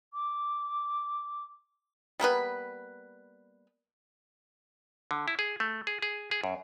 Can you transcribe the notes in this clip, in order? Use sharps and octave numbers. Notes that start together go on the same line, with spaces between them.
D6
G3 A#3 B3 B4
D3
E4
G#4
A3
G#4
G#4
G#4
F#2